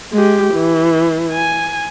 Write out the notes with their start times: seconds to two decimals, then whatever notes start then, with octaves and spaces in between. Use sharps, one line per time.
0.13 G#3 G4
0.54 E3
1.32 G#5